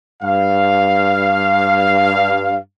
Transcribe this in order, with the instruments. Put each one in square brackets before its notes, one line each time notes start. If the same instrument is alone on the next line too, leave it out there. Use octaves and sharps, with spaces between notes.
[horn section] G2 F5